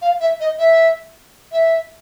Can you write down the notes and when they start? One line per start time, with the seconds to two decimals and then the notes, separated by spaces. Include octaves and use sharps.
0.02 F5
0.20 E5
0.40 D#5
0.59 E5
1.52 E5